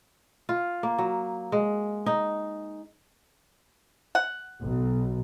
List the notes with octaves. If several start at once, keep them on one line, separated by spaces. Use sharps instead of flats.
F4
A#3
F#3
G#3
D#4
F#5
B1